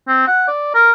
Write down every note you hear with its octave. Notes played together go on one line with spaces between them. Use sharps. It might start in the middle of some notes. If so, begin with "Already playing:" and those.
C4
F#5
D5
A#4